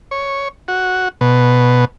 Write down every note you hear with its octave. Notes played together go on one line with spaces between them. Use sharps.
C#5
F#4
B2